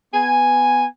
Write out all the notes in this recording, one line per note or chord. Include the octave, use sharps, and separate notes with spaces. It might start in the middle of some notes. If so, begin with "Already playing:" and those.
B3 G#5